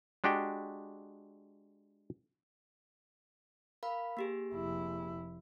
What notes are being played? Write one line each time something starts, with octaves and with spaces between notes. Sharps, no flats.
G#3 D4 F#4 G4 G5
A#4 F5 B5
A#3 G4 G#4
F1 E4